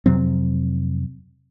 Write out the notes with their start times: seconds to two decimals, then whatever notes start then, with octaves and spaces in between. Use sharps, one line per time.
0.06 F2 C3 F#3 C4